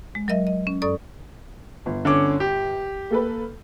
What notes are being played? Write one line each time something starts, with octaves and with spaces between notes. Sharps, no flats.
G#3
F#3 A#4 D#5 E5
D#5
C#4
F#2 A4 D5 C#6 D#6
G1
D3 C#4 D6
G4
A#3 A4 B4